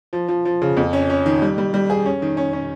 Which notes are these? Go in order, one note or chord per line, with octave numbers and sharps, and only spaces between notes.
F3
F3
F3
C#3
F2
C#4
C#4
D#3
G3
G3
G3
G#4
C#4
D#3
C#4
C#4